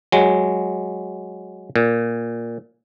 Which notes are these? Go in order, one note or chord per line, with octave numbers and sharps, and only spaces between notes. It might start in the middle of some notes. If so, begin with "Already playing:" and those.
F#3 G#3
A#2